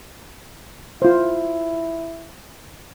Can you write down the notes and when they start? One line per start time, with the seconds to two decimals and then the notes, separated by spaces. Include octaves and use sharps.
1.02 E4 F4 C5